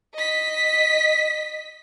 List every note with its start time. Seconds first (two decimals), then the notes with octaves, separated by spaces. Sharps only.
0.14 D#5 B6